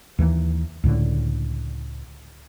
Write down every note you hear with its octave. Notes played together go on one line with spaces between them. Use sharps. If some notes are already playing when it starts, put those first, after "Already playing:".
D#2 E3 A3 A#3
C#2 A2 D3